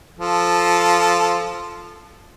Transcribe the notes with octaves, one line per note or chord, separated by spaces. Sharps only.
F3 A4